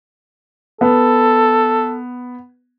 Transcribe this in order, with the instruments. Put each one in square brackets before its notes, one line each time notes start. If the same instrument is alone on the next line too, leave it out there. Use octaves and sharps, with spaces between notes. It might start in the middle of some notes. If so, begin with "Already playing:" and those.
[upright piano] B3 [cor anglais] A4